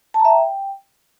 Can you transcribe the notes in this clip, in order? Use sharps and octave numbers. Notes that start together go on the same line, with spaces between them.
A5
A#5
E5
G5